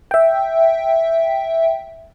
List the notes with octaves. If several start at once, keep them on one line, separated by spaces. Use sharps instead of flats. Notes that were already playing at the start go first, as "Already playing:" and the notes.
E5 G5